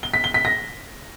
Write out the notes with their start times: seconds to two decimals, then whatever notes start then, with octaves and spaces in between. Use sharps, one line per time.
0.03 G7
0.14 B6
0.24 G7
0.34 B6
0.45 A#6